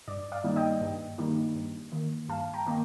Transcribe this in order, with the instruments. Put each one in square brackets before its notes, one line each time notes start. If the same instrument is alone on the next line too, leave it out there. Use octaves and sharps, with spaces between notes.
[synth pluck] G2 D5
D5 F5
D#3 G3 A#3 D#4
D#5 G5
G2
D#3 G3 A#3 D#4
G2
D#3 A#3
G2 F5 A5
G5 A#5
D#3 A#3